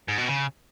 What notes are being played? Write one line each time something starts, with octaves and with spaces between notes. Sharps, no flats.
G#2
B2
C#3